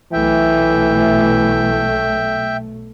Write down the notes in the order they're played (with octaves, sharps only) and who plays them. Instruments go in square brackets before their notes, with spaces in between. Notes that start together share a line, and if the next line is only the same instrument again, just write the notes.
[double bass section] B1 A3 [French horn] E3 [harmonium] E5 G5